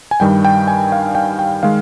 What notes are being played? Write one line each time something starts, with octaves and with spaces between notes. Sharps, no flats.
G#5
G2 D#3 G3 G5
G5
G#5
F5
G5
G5
D#3 G#3 F5